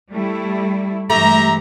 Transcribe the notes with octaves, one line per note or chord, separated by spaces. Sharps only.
G3 A3 E4
G2 E3 G#3 A3 G4 E5 A#5